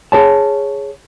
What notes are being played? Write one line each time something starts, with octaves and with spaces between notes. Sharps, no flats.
G#4 C#5 A5